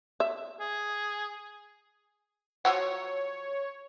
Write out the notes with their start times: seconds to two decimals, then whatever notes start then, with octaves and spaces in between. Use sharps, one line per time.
0.20 E5
0.60 G#4
2.65 F3 F#3 C#5 F#5